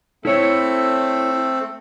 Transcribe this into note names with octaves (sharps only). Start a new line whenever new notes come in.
A3 C4 E4 A4 C#5